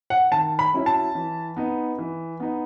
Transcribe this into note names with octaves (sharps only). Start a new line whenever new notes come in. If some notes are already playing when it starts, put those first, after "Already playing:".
F#5
D#3 A5
B5
F#3 C#4 E4
A5
E3
B3 D#4
E3
B3 D#4